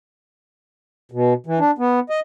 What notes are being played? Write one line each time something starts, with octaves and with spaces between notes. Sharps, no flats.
B2
E3
D4
B3
D#5